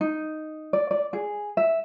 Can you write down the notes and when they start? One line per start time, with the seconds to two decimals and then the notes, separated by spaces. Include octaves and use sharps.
0.01 D#4
0.73 D5
0.91 D5
1.13 G#4
1.57 E5